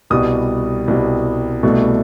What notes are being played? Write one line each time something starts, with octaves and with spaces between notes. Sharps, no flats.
C2 B2 G3 D#6
C2 B2 G3
C2 B2 A3